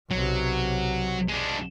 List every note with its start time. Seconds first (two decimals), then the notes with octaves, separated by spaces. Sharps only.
0.11 B1 C3 F#3
1.29 G#3 D4